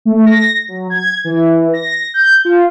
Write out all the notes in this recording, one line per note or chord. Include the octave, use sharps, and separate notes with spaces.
A3
A#6
F#3
G#6
E3
A#6
G6
F4